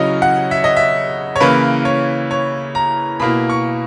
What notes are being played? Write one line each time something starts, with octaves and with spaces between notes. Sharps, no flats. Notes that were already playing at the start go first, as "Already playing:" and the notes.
Already playing: C#3 F#3 C#4 E4 C#5 D#5
F#5
E5
D#5
E5
C#5
C#3 E3 A#3 E4 B4
C#5
C#5
A#5
B2 A#3 E4 B5
C#6